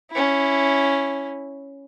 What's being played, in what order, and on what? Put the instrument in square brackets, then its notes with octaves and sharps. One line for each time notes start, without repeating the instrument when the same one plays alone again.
[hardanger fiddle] C#4 E4